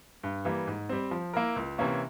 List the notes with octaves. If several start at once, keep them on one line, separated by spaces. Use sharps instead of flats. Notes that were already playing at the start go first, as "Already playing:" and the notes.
G2
E3 G3 A#3
G#2
G3 C4
F3
A#3 E4 A#4
C#2
C3 E3 A#3 C#4